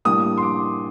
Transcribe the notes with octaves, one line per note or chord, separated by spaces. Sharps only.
A2 G3 A#3 D4 D#6
C6
D6